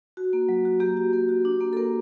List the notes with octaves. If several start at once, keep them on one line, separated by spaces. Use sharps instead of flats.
F#4
A#3
F#3
F#4
A#3 G4
F#4
A#3
F#4
D4
A#3
A4
A#3 A#4